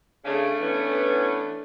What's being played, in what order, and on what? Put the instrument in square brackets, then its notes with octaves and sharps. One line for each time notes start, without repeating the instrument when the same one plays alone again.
[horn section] C#3 [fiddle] A3 D4
[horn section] E3 B3 C#4